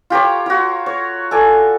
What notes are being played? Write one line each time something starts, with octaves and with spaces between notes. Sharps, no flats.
F4 G4 A#4 C#5
F4 F#4
C#5
A4 D5 G#5